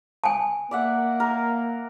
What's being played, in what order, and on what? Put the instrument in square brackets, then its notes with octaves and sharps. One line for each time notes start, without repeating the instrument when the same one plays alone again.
[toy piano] G#5 A5
[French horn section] A#3 [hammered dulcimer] D5 E5 F#5
[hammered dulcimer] A#4